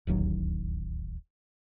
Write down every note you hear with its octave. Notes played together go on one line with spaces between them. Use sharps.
D1 A1 D#2 F#3